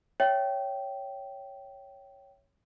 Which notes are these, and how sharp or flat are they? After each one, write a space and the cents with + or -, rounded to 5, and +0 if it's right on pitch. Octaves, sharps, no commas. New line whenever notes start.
C#5 +0 E5 +5 G5 -15